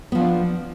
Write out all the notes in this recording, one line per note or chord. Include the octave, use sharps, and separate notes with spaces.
F3 B3 D4 F4